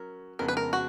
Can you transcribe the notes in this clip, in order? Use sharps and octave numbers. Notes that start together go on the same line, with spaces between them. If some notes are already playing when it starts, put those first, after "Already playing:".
Already playing: F#3 C#4 A#4
F2 C#3 G#3 B3 A#4
B4
A#4
F#4